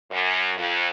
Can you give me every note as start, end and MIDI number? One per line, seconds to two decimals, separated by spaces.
0.11 0.52 42
0.57 0.87 41